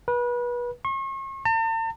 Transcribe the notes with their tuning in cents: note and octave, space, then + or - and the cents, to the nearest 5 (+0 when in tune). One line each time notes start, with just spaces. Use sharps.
B4 -30
C#6 -40
A5 +45